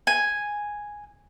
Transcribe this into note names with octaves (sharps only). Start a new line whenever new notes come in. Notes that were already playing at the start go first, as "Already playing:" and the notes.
G#5